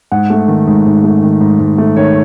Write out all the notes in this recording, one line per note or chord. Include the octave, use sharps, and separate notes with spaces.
G#2 F#5
A3
D#3
G#2
G#2
A3
D#3
G#2
G#2
A3
D#3 C#5